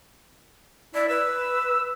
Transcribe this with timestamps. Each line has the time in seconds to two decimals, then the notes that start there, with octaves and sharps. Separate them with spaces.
0.94 E4 D5
1.09 B4 E6